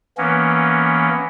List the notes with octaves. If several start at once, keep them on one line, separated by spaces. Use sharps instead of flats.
E3 A#3 B3 C#4